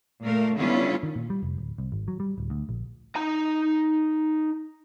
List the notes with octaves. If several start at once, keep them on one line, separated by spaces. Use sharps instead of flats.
A#2 A3 A#4 F5
D3 G3 B3 C#4 E4 F4
D#3
A#2
G3
F1
D1
C2
G#1
F#3
G3
D1
D2
A#1
D#4 A#5